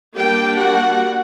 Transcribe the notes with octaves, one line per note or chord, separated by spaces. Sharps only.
G3 A#3 D4 G4 G5
F#4 F#5